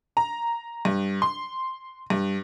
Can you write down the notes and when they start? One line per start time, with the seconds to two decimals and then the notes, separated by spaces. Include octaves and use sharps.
0.17 A#5
0.85 G2
1.22 C6
2.10 G2